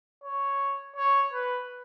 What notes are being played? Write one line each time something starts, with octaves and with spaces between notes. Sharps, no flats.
C#5
C#5
B4